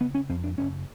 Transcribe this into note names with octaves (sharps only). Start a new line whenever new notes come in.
C#3 B3
C#4
F2 C4
D4
F#1 C#4